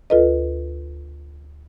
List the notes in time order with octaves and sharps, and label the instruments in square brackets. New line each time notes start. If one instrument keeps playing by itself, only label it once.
[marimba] D2 F4 A4 B4 D#5